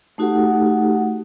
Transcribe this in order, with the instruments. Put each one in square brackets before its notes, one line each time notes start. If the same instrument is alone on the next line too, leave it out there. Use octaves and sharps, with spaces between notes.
[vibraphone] A3 D#4 F#4 G4 A4 F#5